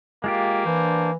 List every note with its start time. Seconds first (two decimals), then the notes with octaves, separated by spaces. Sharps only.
0.24 G#3 A#3 F4 G4
0.66 E3 D4 C5